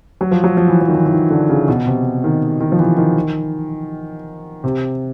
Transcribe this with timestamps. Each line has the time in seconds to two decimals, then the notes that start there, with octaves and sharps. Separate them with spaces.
0.21 F#3
0.31 F3
0.44 F#3
0.57 F3
0.68 E3
0.81 F3
0.88 D#3
0.95 E3
1.06 E3
1.12 D#3
1.30 D3
1.49 C#3
1.68 B2
1.86 C3
2.24 D#3
2.60 D#3
2.72 F3
2.79 E3
2.97 D#3
4.64 C3